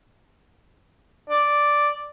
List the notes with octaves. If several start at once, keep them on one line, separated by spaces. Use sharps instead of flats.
D5